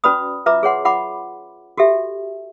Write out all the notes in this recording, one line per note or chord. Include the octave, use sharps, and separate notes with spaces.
C#4 F#4 B4 D5 B5 D#6
F4 B4 E5 A#5 D6
G#4 C#5 F#5 C6
F4 F#5 B5 D6
F#4 G4 A4 E5